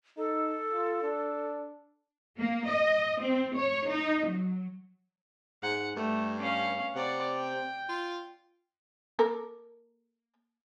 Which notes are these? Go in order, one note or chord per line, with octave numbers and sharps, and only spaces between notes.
D#4 A4
F4
D4
A#3
D#5
C4
C#5
D#4
F#3
G#2 F#5
G2 A3
C#4 F5
C3 D5 F#5
G5
F4
A#3 A4 A#4